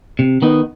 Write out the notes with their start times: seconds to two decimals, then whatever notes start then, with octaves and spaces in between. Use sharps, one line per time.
0.19 C3
0.42 D#3 B3 D#4